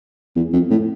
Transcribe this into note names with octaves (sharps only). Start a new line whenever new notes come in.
E2
F2
A2